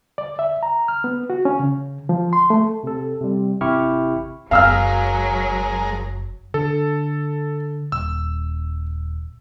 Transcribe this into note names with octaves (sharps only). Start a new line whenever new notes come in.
D5
E5
A#5
F6
B3
F#4
C#4
C#3
F3
C6
A3
C3 A4
C3 G3
G#1 C3 E4 G4 C#6 F6
F#1 F#2 F#3 G#3 A#4 F5 E6 F6
D3 A4
D#1 E6